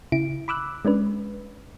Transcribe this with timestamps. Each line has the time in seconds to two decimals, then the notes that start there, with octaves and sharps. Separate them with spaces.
0.12 C#3 E4 D7
0.48 B5 D6 E6 F#6
0.85 G#3 C#4 D4 B4